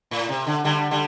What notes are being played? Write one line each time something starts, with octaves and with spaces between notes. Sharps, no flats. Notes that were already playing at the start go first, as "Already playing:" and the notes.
A2
C3
D3
D3 G3
D3 G3